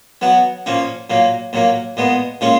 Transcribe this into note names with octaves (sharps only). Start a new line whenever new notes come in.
F#3 B3 F#4
A#2 F3 A#3 C#4
A#2 F#3 A#3
A#2 F#3 A#3
A#2 G#3 B3
A#2 G#3 C#4 F4